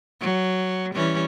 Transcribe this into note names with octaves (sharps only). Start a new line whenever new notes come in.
F#3
E3 G3 C#4